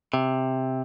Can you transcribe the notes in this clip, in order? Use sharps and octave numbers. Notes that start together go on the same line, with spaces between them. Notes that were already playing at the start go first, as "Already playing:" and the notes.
C3